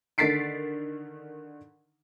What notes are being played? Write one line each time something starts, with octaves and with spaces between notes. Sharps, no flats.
D3 D#3 A6 B6 C7 D7